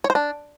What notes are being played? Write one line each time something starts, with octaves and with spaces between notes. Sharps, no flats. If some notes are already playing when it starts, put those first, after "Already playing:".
C#5
C5
D4